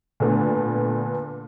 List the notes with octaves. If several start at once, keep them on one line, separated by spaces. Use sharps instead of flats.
A#2 D3 A3 B3